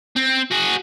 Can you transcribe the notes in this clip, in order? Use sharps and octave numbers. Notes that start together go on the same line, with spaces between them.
C4
F#4 G#4